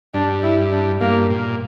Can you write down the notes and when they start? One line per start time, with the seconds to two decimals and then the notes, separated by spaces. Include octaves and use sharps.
0.14 G2 D4
0.43 E4
0.72 D4
1.01 G2 A#3
1.30 A#2